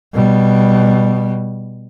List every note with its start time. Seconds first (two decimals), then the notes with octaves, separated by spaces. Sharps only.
0.14 B2 G3